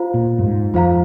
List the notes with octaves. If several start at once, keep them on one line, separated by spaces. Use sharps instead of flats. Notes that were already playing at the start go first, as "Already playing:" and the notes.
Already playing: F4 C5 F5 A#5
A#2
G2
G#2
F2 F4 C5 F5 A#5